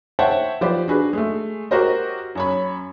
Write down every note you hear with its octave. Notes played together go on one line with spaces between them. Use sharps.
C5 C#5 E5 F#5 G5 A5
F3 G4 B4 C5 D5
D4 F#4 G#4 B4
G#3 A3
F#4 G4 A#4 C5 D#5
F#2 C#5 B5